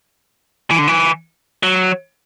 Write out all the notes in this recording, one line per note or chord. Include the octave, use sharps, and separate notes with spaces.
E3
D3
E3
F#3